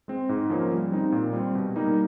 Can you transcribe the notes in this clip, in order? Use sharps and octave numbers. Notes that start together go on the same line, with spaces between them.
G#3 C4
G#2
F3 A#3 C#4
G3
C4 D#4
A#2
G3 C4
B2
G3 A#3 D#4